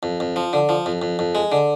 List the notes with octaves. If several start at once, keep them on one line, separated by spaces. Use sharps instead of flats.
F2
F2
F3
D3
F3
F2
F2
F2
G#3
D3